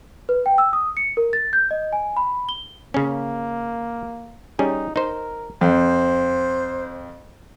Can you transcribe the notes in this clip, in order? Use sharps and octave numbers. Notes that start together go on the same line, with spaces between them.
B4
G5
E6
D#6
C#7
A#4
A6
G6
D#5
G#5
B5
G7
C#3 A#3 C#4
G3 C#4 D#4 G#4
D#4 A#4 C5
F2 C5